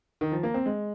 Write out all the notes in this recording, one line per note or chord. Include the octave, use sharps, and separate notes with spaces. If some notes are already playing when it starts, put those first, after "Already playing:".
D#3
F3
A#3
C4
G#3